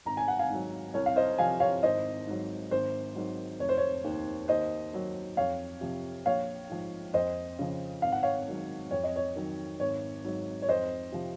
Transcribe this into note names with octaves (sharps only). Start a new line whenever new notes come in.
G#1 A#5
G#5
F#5
F5 G#5
G#2 F#3
C2 C#5
F5
C5 D#5
C3 F3 F5 G#5
C#5 F5
G#1 C5 D#5
G#2 F#3
G#1 C5
G#2 D#3 F#3
F1 C#5
C5
C#5
D#2 D#3
D#2 C5 D#5
D#3 F#3
F2 C#5 F5
C3 F3
A#1 C#5 F5
G#2 F3
F2 C5 D#5
C#3 F3
G#1 F5
F#5
C#5 F5
G#2 D#3 F#3
F2 C#5
D#5
C#5
D#3 F#3
G#1 C#5
G#2 F#3
C#5
F2 C5 D#5
C3 F3